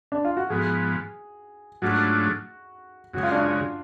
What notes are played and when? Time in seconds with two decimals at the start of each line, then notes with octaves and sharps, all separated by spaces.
0.12 D4
0.25 F4
0.37 F#4
0.50 G#2 F3 B3 G#4
1.82 G#2 F#3 A3 D4 F4 F#4
3.13 F#2 C#3 G#3 F#4
3.23 F4
3.31 D4
3.40 F4